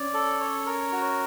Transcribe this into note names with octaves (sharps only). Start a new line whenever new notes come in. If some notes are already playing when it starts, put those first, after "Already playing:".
Already playing: C#4 D5
A4
C#5
A#4
F#4